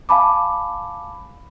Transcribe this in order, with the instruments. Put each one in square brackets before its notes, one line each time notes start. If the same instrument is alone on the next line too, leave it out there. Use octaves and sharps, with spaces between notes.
[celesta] F5 G#5 A5 B5 D6